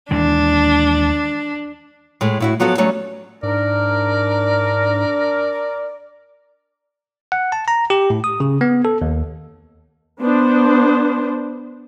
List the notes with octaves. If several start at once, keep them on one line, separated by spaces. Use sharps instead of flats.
D#2 E3 G#3 D4
A2 G#3 A3
A2 E4 F#4
F3 F#3 B3 F#4 A4
F#3 G3 A3 C#4
G#2 D4 A#4 D5
F#5
A5
A#5
G4
A2
D#6
C#3
B3
A4
D#2
B3 D4 C5